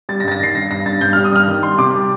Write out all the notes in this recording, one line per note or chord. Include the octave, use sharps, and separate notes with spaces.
G3 A6
A#6
G2 A6
A#6
D#3 C7
G2 A#6
G2 A#6
G2 A6
G2 G6
G3 F6
D#6
G2 F6
D#3
G3 C6
C3 D6
G3